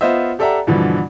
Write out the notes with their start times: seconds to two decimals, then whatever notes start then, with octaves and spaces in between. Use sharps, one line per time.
0.01 B3 F4 C5 D#5 E5
0.39 G4 A4 D5 E5 F#5 A#5
0.67 G2 B2 D3 E3 F3